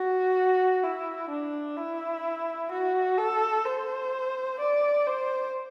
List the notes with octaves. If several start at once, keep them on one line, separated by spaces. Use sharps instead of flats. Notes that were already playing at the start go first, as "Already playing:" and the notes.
Already playing: F#4
E4
D4
E4
F#4
A4
C5
D5
C5